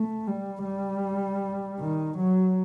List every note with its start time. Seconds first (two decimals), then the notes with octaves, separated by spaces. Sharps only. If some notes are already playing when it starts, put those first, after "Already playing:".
Already playing: A3
0.27 G3
0.65 G3
1.80 D#3
2.18 F#3